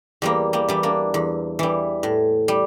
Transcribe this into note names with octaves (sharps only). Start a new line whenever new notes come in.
E2 G3 A#3
G3 A#3
E3 G3
A#3 D4
E2
E3 G3
A2
G3